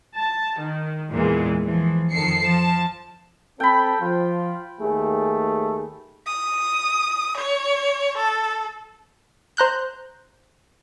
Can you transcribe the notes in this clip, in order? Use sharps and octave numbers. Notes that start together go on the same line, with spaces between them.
A5
D#3
E2 A#2 E3 G#3
E3 F3
F2 D#3 A4 C7 C#7
F3 A5
C4 A4 G5 B5
F3 F4
D#2 A3 G#4
D#6
C#5
A4
C5 A#5 F#6 G6